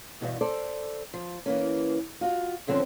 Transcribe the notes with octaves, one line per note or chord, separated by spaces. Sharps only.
E2 G2 B2
A4 C5 D5
F3
E3 A#3 C#4
F4 F#4
G#2 D3 F3 C4 C#4